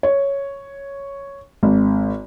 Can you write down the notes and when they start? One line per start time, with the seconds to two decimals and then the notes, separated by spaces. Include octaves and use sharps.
0.03 C#5
1.63 G#1